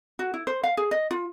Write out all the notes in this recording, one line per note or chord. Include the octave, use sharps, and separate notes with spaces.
F#4
E4
C5
F5
G#4
D#5
F4